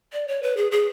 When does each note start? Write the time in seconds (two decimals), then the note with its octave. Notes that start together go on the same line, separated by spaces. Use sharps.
0.13 D5
0.28 C#5
0.43 B4
0.57 G#4
0.72 G#4